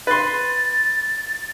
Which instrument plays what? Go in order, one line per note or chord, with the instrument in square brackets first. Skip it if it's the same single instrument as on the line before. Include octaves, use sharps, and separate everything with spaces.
[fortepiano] B4 C6 [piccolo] A6